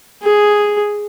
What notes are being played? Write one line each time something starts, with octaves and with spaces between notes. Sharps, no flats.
G#4